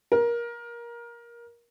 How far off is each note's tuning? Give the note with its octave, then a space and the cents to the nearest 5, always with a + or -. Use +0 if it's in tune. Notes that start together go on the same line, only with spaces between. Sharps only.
A#4 +20